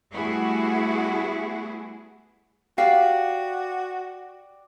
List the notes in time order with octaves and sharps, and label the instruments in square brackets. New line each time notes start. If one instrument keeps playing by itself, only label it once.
[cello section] G3 A3 B3 E4 F#4 G#4
[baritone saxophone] F#4 [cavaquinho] G4 D5 [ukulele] F5